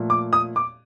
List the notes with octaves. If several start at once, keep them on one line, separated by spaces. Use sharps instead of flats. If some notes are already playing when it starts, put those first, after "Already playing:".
Already playing: A#2 F3 A3
D6
D#6
D6